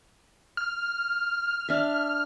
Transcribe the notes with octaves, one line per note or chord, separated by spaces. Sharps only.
F6
D4 E5